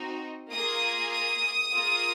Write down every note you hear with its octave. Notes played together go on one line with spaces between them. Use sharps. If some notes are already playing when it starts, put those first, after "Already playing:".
Already playing: C4 D#4 F#4
A#3 F4 G#4 D#6
D#6
A#3 F4 G#4